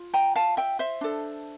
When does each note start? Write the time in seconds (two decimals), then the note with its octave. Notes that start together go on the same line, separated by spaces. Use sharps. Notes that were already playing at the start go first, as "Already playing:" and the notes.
Already playing: F4
0.14 G5 A#5
0.36 F5 A5
0.57 E5 G5
0.79 C5 E5
1.01 D4 A4